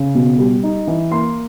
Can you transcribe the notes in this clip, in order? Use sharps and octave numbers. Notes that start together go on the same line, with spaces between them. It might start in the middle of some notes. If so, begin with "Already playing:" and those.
Already playing: C#3
B2
G3
D#4
E3
A#3 C6